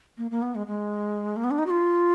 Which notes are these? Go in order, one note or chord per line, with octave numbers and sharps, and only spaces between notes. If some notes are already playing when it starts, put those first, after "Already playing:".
A#3
A#3
B3
G#3
G#3
A#3
B3
D4
D#4
F#4
F4